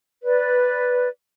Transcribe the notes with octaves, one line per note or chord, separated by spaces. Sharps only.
B4 D5